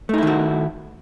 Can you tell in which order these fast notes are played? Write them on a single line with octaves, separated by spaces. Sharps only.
A3 D#4 E4 D#3 F#4